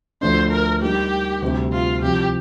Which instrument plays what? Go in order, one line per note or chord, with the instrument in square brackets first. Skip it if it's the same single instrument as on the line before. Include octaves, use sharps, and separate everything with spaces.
[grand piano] D2 D3 F3 A3 D4 [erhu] C5
[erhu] A#4
[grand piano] G3 A#3 D#4 [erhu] G4
[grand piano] D2 C3 G3 C4
[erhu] F4
[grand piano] C2 C3 F3 [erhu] G4